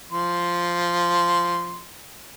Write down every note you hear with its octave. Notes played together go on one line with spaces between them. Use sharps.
F3 C6